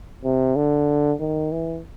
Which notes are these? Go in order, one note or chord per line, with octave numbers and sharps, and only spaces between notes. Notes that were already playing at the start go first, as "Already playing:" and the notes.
C3
D3
D#3
E3